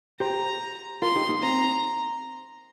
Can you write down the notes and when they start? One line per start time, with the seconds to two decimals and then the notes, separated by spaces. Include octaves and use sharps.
0.20 G4 C5 A#5
1.02 F4 A#4 C6
1.16 D#4 G4
1.29 A#3 D#4
1.42 C4 A#5